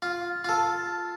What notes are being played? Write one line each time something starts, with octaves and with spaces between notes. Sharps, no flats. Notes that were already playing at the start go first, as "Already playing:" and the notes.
F4
F4 A4